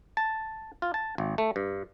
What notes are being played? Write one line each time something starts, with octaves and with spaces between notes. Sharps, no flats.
A5
F4
A5
G#1
A3
G2